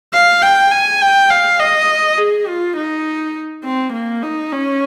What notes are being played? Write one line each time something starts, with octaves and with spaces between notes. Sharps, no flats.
F5
G5
G#5
G5
F5
D#5
G#4
F4
D#4
C4
A#3
D#4
C#4